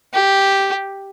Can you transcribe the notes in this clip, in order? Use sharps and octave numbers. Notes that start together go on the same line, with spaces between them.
G4